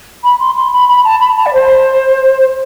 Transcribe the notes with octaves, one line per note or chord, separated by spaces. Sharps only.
B5
C6
C6
B5
B5
A5
B5
A5
D5
C5